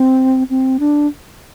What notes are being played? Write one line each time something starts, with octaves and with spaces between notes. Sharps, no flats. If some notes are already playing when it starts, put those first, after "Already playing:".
Already playing: C4
C4
D4